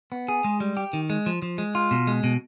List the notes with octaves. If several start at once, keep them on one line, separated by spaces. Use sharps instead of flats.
B3
G#4
G#3
G3
G4
D#3
G#3
F3
F3
G#3
F4
B2
G#3
B2